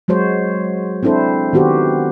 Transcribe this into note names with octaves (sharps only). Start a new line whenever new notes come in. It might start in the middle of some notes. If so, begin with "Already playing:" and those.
F#3 G#3 F#4 C5 C#5
C4 D4 E4 A4 C5
D#3 B3 F#4 G4 C5